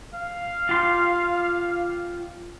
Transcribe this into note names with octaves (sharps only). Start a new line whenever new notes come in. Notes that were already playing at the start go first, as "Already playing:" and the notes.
F5
F4 G4 C6